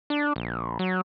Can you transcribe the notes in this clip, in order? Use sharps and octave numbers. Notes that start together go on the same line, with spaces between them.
D4
A#1
F#3